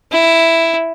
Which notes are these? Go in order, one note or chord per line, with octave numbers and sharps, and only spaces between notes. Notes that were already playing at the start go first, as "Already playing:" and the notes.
E4